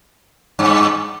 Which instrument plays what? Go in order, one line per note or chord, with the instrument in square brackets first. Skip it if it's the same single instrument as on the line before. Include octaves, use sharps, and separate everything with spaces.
[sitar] G2